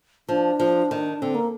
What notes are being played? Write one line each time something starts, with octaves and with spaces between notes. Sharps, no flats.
F3 D4
F3
D#3
D3 C4
A#3